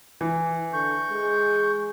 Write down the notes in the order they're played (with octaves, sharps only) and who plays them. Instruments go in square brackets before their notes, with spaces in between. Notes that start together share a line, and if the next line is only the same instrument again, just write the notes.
[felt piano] E3
[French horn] D3 [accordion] C#6 G6
[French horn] G#3